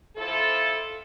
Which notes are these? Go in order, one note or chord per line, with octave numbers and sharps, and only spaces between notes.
F2 F3 E4 A4